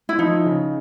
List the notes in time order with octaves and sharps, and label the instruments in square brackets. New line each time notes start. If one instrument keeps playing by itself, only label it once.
[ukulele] E4
[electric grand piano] F3 [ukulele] D#4
[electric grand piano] C#3